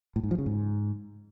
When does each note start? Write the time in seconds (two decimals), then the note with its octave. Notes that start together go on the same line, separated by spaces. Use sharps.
0.16 A2
0.23 G#2
0.31 F3
0.39 C#3
0.46 G#2